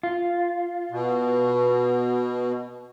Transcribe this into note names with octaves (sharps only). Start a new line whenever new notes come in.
F4
B2